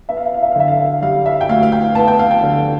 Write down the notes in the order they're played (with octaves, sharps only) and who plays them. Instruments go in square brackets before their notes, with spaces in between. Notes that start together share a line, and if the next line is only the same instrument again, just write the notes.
[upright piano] B3 E5
F5
E5
F5
E5
F5
D3 E5
F5
E5
G3 F5
E5
G5
D2 F5
F5
G5
B3 A5
G5
F5
G5
D3